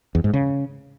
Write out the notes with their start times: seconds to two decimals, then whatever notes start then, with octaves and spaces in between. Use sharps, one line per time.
0.15 E2
0.24 G#2
0.34 C#3